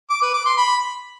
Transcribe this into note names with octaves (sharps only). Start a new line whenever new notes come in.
D6
B4
D6
C6
B5